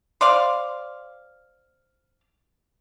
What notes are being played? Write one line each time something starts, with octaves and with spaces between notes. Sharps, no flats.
C5 D5 F5